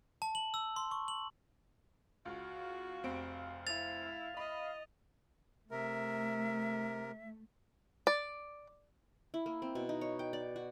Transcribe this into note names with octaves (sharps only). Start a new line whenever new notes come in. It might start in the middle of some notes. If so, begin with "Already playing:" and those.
A5
F#7
E6
C6
C#6
F#7
C#2 F#4 F5
F1 C4 D7
E4 A6 F7
D#5 B5
C3 A3 A#4 E5
D5
E4
A#3
C4
B2
D#4
C#5
G5
D5
F#4